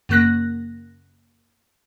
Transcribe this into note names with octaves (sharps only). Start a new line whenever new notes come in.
F#2 C#3 A#3 F#6 A#6